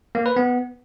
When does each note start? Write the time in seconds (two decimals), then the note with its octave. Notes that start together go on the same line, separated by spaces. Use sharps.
0.15 A#3
0.26 B4
0.36 B3